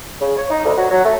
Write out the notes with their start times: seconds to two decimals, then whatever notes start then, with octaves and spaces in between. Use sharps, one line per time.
0.20 C#3
0.37 C#5
0.50 D#4
0.65 D2
0.77 F#3
0.91 F#3
1.05 A3